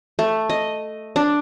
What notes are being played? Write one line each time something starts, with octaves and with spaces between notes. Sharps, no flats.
A3
D#5
D4